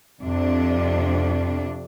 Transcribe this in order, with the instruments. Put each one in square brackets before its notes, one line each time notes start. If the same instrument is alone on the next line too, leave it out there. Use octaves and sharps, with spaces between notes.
[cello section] F2 C3 D4